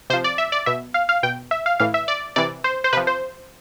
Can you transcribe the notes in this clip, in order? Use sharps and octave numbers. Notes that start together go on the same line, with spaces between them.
C3 F3 C5
D5
E5
D5
B2 E5
F5
F5
B2 G5
E5
F5
A2 E3 F5
E5
D5
C3 E3 D5
C5
C5
C3 F3 B4
C5